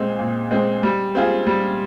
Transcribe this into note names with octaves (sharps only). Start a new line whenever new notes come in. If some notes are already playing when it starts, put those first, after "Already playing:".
Already playing: A#2 G#3 C4
A#2
G#3 C4
G3
C4 F4 G#4
G3